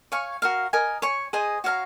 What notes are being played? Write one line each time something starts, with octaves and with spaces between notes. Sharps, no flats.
C#5 F5 G#5 C#6
F#4 A#4 F5
A#4 D#5 G#5
C#5 G#5 C#6
G#4 C5 D#5 G#5
F#4 C#5 F5 A#5